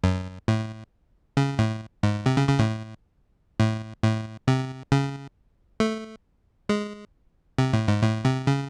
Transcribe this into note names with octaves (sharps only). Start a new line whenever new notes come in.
F#2
A2
C#3
A2
G#2
C3
C#3
C#3
A2
A2
A2
C3
C#3
A3
G#3
C3
A2
G#2
A2
C3
C#3